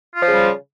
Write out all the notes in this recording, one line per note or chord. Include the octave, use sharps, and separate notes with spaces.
C#3 F3 G3 F4